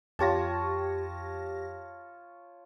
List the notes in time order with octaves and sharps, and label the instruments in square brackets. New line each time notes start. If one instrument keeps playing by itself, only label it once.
[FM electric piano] F2 G4 A#6 [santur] F4 C#5 A5